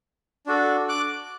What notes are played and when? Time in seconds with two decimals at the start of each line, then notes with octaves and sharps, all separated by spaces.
0.46 D4 F#4 A4
0.89 D6 F#6